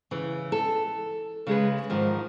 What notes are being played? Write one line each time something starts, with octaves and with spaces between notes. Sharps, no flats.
C#3 E3
A4
C#3 G#3 G#4 B4
G#2 D#3 F3